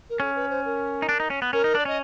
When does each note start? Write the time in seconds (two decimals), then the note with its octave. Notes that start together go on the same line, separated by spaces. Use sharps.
0.09 A#4
0.20 C#4 A4
0.35 B4
0.50 C5
0.65 A#4
1.02 D#4
1.09 D4
1.20 D#4
1.30 C#4
1.42 B3
1.53 C#4 A#4
1.64 D#4
1.75 D4 D5
1.85 C#4 D#5